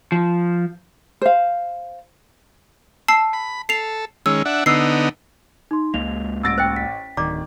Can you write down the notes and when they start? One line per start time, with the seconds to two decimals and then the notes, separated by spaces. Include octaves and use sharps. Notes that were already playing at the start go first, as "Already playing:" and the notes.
0.12 F3
1.22 C5 F5
3.08 A5 E6 C7
3.33 B5
3.69 A4 C7 F7
4.26 D#3 G#3 C#4 E6
4.45 D4 E5 F#5
4.66 D3 B3 D#4 E6 C7
5.71 D#4 C6
5.94 C#2 G#3 A#3 F7
6.43 A1 E6 A6 A#6 D7
6.58 C5 D#5 G5
6.76 B6
7.17 D1 D#3 D5 A#5 D6